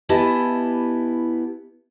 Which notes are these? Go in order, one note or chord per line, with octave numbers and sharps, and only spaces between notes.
B3 E4 G4 D#5 G#5 A5